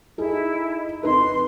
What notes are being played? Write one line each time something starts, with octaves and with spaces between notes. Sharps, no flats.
D#4 E4 G#4 A4
F2 D#4 A4 B4 C6